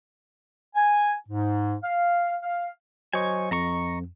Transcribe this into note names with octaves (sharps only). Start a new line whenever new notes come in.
G#5
G#2
F5
F5
F#3 C5 D#5 G#5 C#6
F2 D#5 A#5 C#6